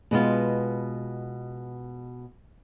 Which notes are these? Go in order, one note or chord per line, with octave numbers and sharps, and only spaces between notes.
B2 G#3 B3 F4